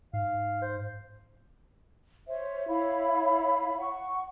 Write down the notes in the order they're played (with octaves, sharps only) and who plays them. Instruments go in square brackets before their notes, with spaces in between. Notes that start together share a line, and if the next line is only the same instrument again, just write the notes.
[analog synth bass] G#2 [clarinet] F5
[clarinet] C5
[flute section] C5 C#5 E5
E4 C#5 F5 B5
F#5 C#6